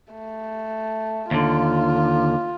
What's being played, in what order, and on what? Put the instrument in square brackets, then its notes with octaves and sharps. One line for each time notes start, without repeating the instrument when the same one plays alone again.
[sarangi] A3
[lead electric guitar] D#2 D3 [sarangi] F4